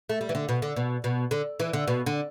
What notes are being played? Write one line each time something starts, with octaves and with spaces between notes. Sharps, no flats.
A3
G3
E3
D3
B2
D3
B2
B2
D3
E3
D3
B2
D3